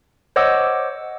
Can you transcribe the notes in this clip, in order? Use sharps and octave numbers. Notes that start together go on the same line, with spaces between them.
C5 C#5 D#5 F#5 D6 E6